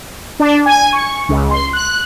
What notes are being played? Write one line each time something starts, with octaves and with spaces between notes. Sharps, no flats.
D4
G#5
C#6
C#2
C6
F#6